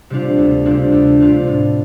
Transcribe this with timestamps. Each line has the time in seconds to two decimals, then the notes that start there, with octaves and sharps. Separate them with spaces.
0.10 C3 G3 D4 F4
0.38 D2
0.65 C3 G3 D4 F4
0.92 D2
1.20 C3 G3 D4 F4
1.47 A2